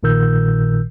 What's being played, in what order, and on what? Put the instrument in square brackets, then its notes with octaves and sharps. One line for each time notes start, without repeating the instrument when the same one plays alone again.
[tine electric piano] A#1 A#2 D#3 A#4 E6 G6